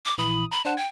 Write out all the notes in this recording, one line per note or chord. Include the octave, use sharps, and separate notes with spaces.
D6
A#1 E3 B5 D#6
A#5 B5
D4 C5 F#5 A5
G5 G#6